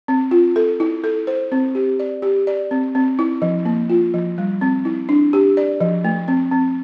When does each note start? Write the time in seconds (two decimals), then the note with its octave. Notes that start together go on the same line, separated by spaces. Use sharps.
0.08 C4
0.31 F4
0.56 A4
0.80 E4
1.04 A4
1.27 C5
1.52 C4
1.75 G4
1.99 D5
2.22 G4
2.47 D5
2.71 C4
2.95 C4
3.19 E4
3.42 F3
3.65 A#3
3.90 F4
4.14 F3
4.38 G3
4.61 C4
4.85 E4
5.09 D4
5.33 G4
5.57 D5
5.81 F3
6.05 A3
6.28 C4
6.52 C4